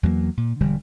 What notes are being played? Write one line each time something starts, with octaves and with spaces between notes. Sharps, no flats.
E2 F#3 G#3 A#3
A#2
E1 D3 G3